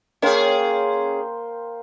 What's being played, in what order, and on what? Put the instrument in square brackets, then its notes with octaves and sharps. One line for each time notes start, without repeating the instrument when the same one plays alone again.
[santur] A#3 C5 G5 [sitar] C#4 G#4